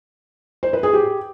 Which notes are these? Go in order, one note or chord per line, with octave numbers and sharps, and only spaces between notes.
C5
B4
G#4
G4